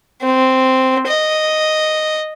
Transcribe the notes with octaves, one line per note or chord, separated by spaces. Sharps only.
C4
D#5